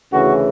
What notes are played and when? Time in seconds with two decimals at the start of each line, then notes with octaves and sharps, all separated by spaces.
0.12 D2 C#3 E3 F#4